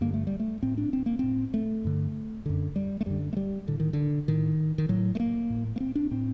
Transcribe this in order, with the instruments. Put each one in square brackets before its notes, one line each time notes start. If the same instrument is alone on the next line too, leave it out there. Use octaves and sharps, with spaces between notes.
[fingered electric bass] G2 D3 A#3
A3
G3
A3
A2 C4
D4
C4
A#3
A2 C4
A3
G2 D3
F#2 D3
G3
A3
F#2 D3 G3
A3
G3
A2 D3
D#3
D3
A2 D#3
D#3
A2 F#3
A3
A#3
A2
A#3
C4
D4
A2 C4